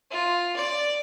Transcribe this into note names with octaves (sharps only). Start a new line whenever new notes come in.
F4
D5